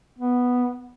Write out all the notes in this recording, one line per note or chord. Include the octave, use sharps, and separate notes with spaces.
B3